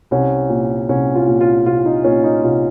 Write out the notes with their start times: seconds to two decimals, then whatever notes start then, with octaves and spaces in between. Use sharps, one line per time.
0.11 C2 C#4
0.49 A#2
0.89 C2 C#4
1.15 F4
1.27 A#2
1.40 F4
1.66 C2 F4
1.86 D#4
2.04 A#2 C#4
2.24 D#4
2.43 C2 F4